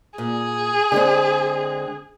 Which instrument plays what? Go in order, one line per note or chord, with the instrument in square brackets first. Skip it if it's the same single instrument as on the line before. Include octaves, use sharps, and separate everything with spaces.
[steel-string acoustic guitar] A#2 [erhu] G#4
[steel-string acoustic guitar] D3 G#3 C4